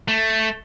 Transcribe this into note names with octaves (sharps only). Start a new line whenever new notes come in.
A3